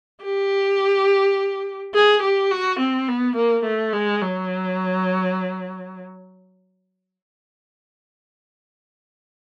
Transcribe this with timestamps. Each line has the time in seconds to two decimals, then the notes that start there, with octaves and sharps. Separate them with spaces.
0.24 G4
1.95 G#4
2.22 G4
2.51 F#4
2.79 C4
3.08 B3
3.36 A#3
3.65 A3
3.93 G#3
4.21 F#3